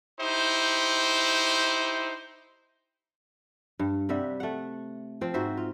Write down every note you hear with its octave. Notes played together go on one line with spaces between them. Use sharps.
D#4 E4 G4 C5
G2
C3 G3 E5 F#5
A3 F#5
F3 C4
G#2 F#4 C5 E5
F4